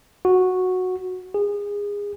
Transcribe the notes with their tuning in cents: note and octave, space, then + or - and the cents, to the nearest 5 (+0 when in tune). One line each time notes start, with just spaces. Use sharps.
F#4 -10
G#4 -25